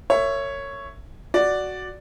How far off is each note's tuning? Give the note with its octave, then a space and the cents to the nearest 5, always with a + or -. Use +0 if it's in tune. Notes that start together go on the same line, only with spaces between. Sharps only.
A#4 -35 C#5 +0 E5 +10
F#4 +0 D5 +0